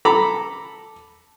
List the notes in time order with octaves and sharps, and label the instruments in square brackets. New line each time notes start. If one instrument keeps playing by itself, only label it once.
[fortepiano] A4 A#5 B5 D6